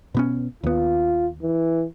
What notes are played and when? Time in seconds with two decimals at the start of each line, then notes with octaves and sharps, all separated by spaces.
0.14 B2 B3 C#4
0.64 D#2 B3 F4
1.42 E3